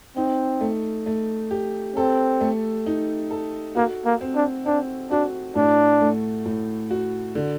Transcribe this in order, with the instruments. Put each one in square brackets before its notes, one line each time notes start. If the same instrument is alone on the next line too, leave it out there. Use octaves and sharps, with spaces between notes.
[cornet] C4 [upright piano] D#4
[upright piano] A3
A3
G4
[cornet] C4 [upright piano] A4
[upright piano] A3
D#4
A4
[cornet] A#3 [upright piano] F#4
[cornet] A#3
[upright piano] C4
[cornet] D4
[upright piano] C4 [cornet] D4
[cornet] D4 [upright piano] F#4
[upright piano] A2 [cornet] D4
[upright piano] A3
A2
F#4
D3